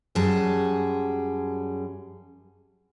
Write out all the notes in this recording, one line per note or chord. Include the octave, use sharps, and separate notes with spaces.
F#2 G3 G#4 A5